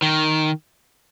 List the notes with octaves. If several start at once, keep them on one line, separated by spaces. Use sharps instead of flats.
D#3